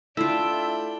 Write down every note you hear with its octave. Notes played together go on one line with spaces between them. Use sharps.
A3 D4 E4 F4 E5 G5